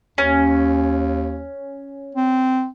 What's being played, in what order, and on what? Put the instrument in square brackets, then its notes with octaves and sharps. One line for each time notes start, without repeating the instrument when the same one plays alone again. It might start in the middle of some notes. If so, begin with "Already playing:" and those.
[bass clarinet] D#2 [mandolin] C#4
[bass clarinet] C4